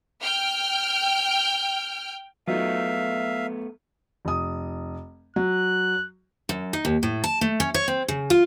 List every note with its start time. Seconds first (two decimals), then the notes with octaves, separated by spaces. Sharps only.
0.22 G5 F6
2.47 F#3 A3 B3 D#4 F4 E5 F5
4.25 F1 D#6
5.36 F#3 F#6
6.49 F#2
6.73 D#4
6.85 D#2
7.03 A2
7.24 A5
7.41 A3
7.60 C#4
7.74 C#5
7.88 C4
8.08 C#3
8.30 F4